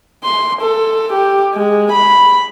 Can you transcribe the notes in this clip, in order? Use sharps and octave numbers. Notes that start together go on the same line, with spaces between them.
C6
A4
G4
G#3
B5